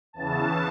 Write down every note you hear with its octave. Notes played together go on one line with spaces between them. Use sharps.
E2 C#3 E3 A5